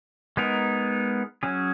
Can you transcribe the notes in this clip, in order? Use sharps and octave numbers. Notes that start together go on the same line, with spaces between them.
G#3 B3 D#4 A#4
F#3 C#4 G#4